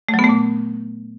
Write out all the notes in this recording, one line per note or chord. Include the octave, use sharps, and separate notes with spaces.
A3
F#3
B3
A3
A#2